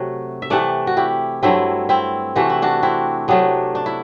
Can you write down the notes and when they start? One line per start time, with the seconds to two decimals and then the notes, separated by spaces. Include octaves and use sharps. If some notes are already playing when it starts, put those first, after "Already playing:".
Already playing: C3 F#3 A3 F#5
0.42 E5
0.50 C3 E3 A3 D5 F#5
0.87 F#4
0.97 E4 G4
1.43 G2 F#3 A3 C4 E4
1.89 C4 E4
2.36 C3 E3 A3 F#4
2.50 E4
2.62 D4 F#4
2.83 C4 E4
3.28 C3 F#3 A3 B3 D4
3.75 D4
3.86 E4